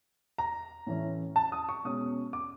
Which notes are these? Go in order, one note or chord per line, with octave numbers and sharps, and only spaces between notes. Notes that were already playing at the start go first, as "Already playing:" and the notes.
A#5
A2 E3 A3 C#4
A5
D#6
C#6
B2 G#3 C#4 D#6
D6